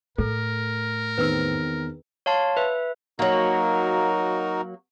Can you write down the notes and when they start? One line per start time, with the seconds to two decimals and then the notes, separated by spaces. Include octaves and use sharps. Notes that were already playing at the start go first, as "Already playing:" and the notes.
0.18 A2 A4 A#4
1.18 E2 D#3 C4 B4 E6
2.26 C#5 F5 A5 C6
2.57 B4 E5
3.19 F#3 A#3 D#4 F#4 A#4